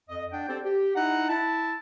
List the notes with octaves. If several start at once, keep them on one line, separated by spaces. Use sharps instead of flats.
F2 D#5
D4 F#5 G5
C4 G4 A4 C5 D5
G4
D#4 E4 F#5
E4 A5